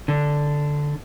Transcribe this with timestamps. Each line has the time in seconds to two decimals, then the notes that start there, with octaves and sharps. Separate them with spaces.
0.08 D3